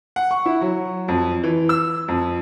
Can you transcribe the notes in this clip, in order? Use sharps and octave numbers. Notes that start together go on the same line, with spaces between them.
F#5
C#6
E4
F#3
F2
E3
E6
F2